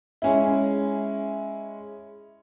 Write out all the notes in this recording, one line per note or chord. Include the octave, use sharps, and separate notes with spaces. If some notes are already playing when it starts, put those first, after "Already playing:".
G#3 C#4 E4